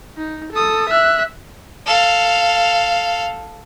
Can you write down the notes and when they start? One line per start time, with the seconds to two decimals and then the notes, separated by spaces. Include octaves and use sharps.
0.17 D#4
0.52 A4 D#6
0.89 E5 F#6
1.86 A4 F5